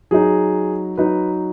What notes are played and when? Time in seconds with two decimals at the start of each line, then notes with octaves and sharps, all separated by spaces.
0.11 F#3 D#4 G#4
0.98 F#3 D#4 B4